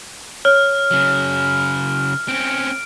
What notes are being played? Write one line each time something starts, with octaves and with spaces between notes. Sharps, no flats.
C#5 F6
C#3 F#3
C4 C#4 D7